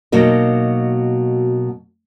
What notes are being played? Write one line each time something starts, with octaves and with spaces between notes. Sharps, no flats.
B2 F#3 A#3 D#4